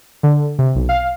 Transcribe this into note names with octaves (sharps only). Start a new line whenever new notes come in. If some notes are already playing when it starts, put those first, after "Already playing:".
D3
C3
B1
F5